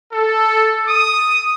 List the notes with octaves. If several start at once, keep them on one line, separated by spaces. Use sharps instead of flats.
A4
D#6